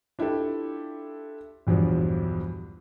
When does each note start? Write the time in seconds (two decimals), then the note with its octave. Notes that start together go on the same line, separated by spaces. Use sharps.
0.19 D4 E4 F4 G4 A4
1.67 A#1 E2 G2 F3 F#3